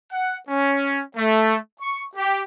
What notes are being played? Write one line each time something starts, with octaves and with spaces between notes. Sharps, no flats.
F#5
C#4
A3
C#6
G4